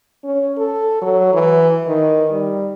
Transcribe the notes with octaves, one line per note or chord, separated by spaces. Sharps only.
C#4
A4
F#3
E3
D#3
G3